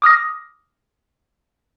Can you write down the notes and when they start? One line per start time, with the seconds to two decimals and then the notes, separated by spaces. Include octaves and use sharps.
0.02 D6 D#6 F6 A#6